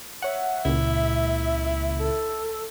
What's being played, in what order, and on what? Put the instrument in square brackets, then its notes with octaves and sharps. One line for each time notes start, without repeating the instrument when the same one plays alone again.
[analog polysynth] C#5 F#5 [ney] E5
[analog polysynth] C#2 A#2 [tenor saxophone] E4
[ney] A4